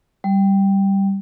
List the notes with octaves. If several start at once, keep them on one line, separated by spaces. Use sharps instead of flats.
G3